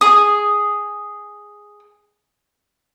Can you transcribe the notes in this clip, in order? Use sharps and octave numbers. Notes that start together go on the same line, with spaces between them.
G#4 D#6